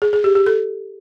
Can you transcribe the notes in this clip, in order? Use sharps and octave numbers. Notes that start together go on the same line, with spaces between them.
G#4
G#4
G4
G4
A4